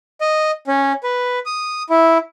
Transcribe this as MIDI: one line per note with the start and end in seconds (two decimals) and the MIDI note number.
0.21 0.51 75
0.67 0.93 61
1.03 1.39 71
1.46 1.83 87
1.90 2.18 64